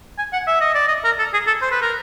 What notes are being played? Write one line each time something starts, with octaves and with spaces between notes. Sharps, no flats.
G#5
F#5
E5
D#5
D5
D#5
A#4
A4
G#4
A4
C5
B4
A#4